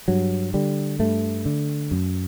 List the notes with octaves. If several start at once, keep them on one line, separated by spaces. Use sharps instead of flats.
G2 F#3
D3 G3
G2 A3
D3
F#2